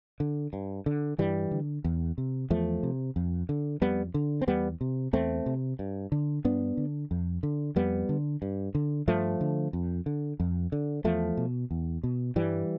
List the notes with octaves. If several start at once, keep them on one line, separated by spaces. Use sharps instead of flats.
D3
G2
D3
G2 E3 G3
D3
E2
C3
E2 F3 A3
C3
F2
D3
F2 G3 B3
D3
C4
E2 G3 B3
C3
E2 A3 C4
C3
G2
D3
G2 B3 D4
D3
F2
D3
F2 G3 B3
D3
G2
D3
G2 F3 A3
D3
F2
D3
F2
D3
E2 F3 A3
B2
E2
B2
G2 E3 G3